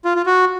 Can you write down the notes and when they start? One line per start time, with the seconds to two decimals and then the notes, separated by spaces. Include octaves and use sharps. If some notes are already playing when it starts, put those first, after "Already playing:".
0.05 F4
0.16 F4
0.26 F#4